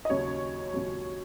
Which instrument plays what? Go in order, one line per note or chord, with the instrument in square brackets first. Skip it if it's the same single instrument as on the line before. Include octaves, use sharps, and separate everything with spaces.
[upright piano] D#5
D#2 C#3 F#3 C#5
D#2 C#3 F#3